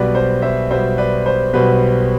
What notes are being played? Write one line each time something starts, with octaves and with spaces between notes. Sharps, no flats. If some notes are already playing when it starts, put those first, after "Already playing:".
Already playing: B1 B2 G3 B3 B4 D5
C5
C5 E5
B1 B2 G3 B3 C5 E5
B4 D5
C5
B1 B2 G3 B3 B4